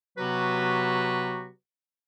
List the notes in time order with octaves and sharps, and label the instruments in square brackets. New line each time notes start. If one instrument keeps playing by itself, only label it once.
[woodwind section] C3 F#3 B3 F#4 G4 B4